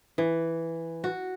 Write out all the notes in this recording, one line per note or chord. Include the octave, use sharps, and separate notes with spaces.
E3
F#4